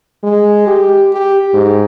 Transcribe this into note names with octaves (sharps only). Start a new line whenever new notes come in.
G#3
G4
G4
G#2